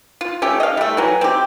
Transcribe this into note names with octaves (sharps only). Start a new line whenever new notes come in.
F4
A3 C#4 G4
D#5 F5
G3 A3
E3 F#3
C4 G4